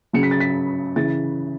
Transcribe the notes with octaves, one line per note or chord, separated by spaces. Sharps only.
C#3 F#3 C#7
B6
A6
B6
C#3 E3 A6